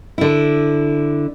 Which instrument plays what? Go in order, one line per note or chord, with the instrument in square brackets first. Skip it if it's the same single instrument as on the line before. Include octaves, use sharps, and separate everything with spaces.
[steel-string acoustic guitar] D3 E4